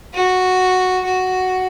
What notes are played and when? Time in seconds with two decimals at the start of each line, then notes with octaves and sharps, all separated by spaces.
0.14 F#4
1.06 F#4